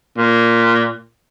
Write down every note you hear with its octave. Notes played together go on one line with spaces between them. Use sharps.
A#2